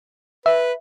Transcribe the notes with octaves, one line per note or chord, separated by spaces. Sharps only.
B4 E5